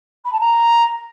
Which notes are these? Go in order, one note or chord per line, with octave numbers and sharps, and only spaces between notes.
B5
A5
A#5